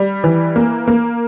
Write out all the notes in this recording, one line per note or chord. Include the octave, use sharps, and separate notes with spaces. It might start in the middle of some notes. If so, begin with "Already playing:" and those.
Already playing: G3
E3
A#3
A#3